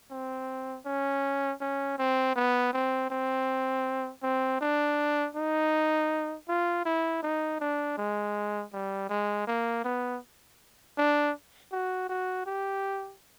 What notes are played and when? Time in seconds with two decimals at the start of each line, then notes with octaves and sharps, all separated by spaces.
0.11 C4
0.86 C#4
1.61 C#4
1.98 C4
2.36 B3
2.73 C4
3.11 C4
4.23 C4
4.61 D4
5.35 D#4
6.48 F4
6.85 E4
7.23 D#4
7.60 D4
7.98 G#3
8.73 G3
9.09 G#3
9.47 A#3
9.85 B3
10.98 D4
11.72 F#4
12.09 F#4
12.46 G4